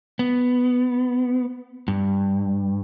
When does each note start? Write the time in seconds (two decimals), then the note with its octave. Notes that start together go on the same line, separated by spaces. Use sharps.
0.19 B3
1.88 G2